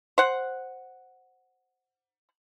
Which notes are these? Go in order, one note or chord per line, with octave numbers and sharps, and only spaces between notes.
C5 F#5